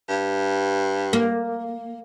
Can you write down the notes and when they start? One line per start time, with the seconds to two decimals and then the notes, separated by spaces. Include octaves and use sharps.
0.09 G2
1.13 A#3